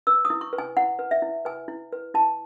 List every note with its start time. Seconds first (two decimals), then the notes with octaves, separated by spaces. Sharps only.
0.07 B4 E6
0.25 D#6
0.30 E4
0.41 C#6
0.53 B4
0.58 G#5
0.77 E4 F#5
0.99 B4
1.11 E5
1.22 E4
1.45 B4 G#5
1.68 E4
1.92 B4
2.14 E4 A5